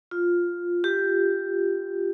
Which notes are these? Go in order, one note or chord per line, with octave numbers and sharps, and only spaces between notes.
F4
G4